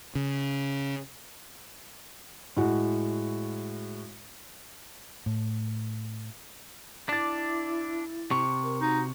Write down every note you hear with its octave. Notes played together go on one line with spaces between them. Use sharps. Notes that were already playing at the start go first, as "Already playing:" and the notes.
C#3
A2 G#3 F#4
A2
D4 E4 D6 A6
C3 C#6
A#4
D#4 F#4